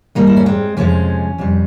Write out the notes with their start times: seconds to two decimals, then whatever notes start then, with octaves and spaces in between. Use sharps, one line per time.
0.15 G#2 G3 A#3
0.27 E4
0.37 C#4
0.46 G#3 C4
0.77 F2 C3 F3 G#3 A#3 C#4
1.38 F2 C3 G3